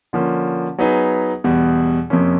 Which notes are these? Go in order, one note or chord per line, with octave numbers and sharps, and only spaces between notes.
D3 F3 A#3 C#4
F#3 B3 D#4 G#4 B4
E2 B2 G3
F2 C3 F3 A#3 C#4